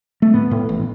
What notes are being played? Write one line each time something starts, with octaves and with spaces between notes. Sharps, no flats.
A3
A2 B3
A2
A1